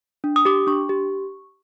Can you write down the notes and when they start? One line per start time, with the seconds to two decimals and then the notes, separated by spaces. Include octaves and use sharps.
0.24 D4
0.36 D#6
0.45 G4 D6
0.67 D4 C#6
0.89 G4